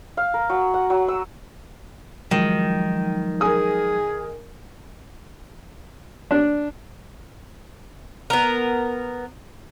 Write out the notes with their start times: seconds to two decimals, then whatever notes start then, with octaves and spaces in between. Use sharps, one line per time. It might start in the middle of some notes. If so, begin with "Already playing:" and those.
0.17 F5
0.34 A#4
0.49 F#3
0.74 F#5
0.90 F#3
1.08 E6
2.31 D#3 F3 F#3 G#3
3.41 G#4 A#4 G#5 D#6
6.31 D4
8.30 B3 A#4